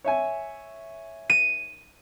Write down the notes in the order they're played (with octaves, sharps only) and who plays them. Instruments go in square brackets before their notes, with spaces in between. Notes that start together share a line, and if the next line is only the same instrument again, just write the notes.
[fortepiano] C#5 E5 G#5
[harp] D#7